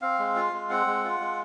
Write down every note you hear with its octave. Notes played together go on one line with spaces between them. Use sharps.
C4 F5
G#3
F4
G#3
C4 F#5
G#3
F4
G#3